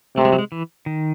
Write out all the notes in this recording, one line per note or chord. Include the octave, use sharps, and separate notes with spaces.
C3 A3
G#3
F#3
G#3
E3
D#3